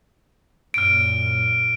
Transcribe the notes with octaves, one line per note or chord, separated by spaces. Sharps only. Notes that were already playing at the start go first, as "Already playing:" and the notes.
F#2 A#2 F6 D7